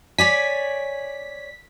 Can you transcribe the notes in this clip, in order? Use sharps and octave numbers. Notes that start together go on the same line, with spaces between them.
C#5 D5 G#5 B6